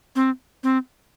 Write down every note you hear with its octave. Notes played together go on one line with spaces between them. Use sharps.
C4
C4